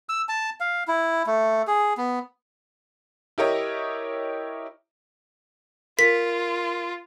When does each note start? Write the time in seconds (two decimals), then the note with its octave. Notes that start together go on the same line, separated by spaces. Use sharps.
0.09 E6
0.29 A5
0.60 F5
0.88 E4
1.26 A3
1.67 G#4
1.97 B3
3.38 E4 G4 A#4 C#5 D#5
5.99 F4 A#4 B6